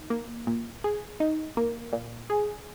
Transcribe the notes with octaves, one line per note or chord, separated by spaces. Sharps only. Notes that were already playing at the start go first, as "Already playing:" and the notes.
Already playing: D#4
A#3
A#2
G#4
D#4
A#3
A#2
G#4